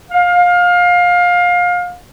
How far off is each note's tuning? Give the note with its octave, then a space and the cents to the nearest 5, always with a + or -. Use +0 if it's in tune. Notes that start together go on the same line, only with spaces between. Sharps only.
F5 +25